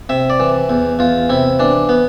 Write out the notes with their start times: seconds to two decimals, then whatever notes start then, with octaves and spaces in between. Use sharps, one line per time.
0.09 C3 E5
0.30 D5
0.40 E3
0.69 E2
0.99 E2 F4
1.29 C3 E4
1.59 E3 D4
1.89 B3